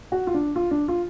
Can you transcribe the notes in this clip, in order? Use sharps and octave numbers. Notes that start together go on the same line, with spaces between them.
F#4
F4
D4
F4
D4
F4